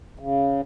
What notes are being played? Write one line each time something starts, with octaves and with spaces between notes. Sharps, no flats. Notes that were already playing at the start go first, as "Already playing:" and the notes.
C#3